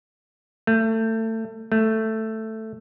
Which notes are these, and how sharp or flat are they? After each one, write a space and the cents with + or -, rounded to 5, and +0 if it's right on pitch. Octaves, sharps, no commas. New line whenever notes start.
A3 +25
A3 +5